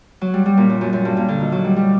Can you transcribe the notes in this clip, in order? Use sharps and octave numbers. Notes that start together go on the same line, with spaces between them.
F#3
G3
G3
A#2
F#2
F#2
F#2
G2
A#2
D3
D#3
F#3
G3
G3